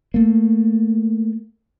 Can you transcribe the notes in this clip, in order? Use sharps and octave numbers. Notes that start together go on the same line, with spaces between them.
A3 A#3